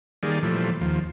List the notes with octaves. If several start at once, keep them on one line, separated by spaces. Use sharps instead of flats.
D#3 G3 A#3 G#4 D5
A#2 E3 F3 G3 A3
D#2 F3